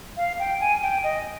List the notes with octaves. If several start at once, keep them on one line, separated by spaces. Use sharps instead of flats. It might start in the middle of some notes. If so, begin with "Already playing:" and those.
F5
G5
G#5
G5
D#5